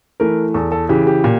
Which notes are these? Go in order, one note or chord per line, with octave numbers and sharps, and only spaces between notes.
E3 A3 A#4
E2 A4
A4
C#3 E3 G4
G4
A#2